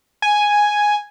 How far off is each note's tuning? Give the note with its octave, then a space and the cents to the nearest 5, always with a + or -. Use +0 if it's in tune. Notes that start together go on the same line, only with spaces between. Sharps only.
G#5 +0